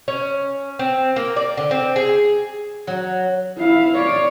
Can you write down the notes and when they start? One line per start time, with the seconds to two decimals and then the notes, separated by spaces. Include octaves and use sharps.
0.08 C#4
0.79 C4
1.16 A#3
1.36 D5
1.57 D3
1.71 C4
1.96 G#4
2.87 F#3
3.58 E4 F5
3.97 C#5 D5